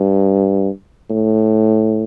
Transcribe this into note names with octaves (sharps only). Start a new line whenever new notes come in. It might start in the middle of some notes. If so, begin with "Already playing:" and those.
Already playing: G2
A2